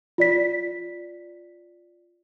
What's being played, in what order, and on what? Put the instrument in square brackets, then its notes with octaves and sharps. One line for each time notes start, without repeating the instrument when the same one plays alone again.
[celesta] F4 D5 B6